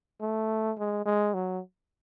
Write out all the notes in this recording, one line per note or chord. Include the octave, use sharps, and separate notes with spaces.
A3
G#3
G#3
F#3